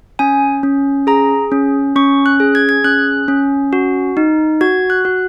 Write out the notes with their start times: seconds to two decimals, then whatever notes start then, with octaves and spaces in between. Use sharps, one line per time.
0.19 C#4 G#5
0.63 C#4
1.07 G#4 A#5
1.52 C#4
1.96 C#4 C#6
2.26 F#6
2.40 G#4
2.55 G#6
2.69 G#6
2.84 C#4 F#6
3.28 C#4
3.73 F#4
4.17 D#4
4.61 F#4 G#6
4.90 F#6
5.05 F#4